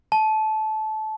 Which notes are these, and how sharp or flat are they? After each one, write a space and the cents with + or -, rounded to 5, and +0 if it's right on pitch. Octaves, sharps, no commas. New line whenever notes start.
A5 -20